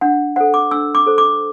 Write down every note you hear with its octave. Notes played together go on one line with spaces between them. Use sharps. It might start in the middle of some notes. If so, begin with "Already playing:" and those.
D4 F#5
A4 C5 F#5
D6
D4 E6
D6
A4 C5
D6